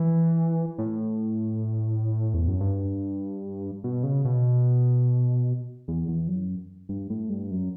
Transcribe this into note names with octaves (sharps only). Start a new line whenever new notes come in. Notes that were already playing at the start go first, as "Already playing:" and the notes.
Already playing: E3
A2
E2
F#2
G2
B2
C#3
B2
E2
E2
F#2
G2
A2
G2
F#2